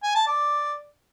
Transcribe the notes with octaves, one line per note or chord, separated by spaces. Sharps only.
G#5
A5
D5